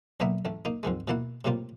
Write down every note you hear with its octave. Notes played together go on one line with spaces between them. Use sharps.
B1 D3 A#3 B3 A#4 E5
A1 A3
A#3 D#4
F2 G#2 D#3 G#3
B2 E3 A#3 E4 F#5
A2 C3 G3 A#3 F4